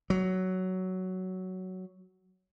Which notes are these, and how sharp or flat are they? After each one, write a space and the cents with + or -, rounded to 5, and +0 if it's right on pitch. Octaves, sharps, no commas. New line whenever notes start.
F#3 +10